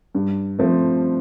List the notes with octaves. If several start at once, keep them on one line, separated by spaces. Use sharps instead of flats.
G2
F3 A3 C4